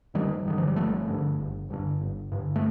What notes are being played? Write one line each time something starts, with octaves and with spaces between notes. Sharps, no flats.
G1 D#3 G3
G2 D3 D#3
F3
G3
G1 F3 A3
G2 D3
G1
G2 D3
G1
G2 D3
A3